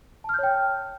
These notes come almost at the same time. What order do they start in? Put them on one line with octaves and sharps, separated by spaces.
A5 F6 G6 C#5 G5